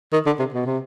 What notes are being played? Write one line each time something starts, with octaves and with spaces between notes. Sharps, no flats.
D#3
D3
C3
B2
C3